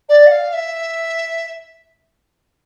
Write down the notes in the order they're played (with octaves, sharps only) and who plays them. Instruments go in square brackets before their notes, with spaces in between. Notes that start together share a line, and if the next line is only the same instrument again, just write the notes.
[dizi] D5
F#5
F5
E5